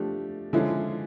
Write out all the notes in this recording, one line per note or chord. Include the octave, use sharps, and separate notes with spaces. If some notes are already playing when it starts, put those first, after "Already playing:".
Already playing: F3 A3 D4 G4
D3 F3 G#3 C#4 E4